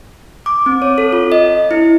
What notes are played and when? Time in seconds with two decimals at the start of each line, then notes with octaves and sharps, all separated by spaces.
0.46 D6
0.66 C4
0.82 C#5
0.98 A4
1.13 F4
1.32 D#5
1.71 E4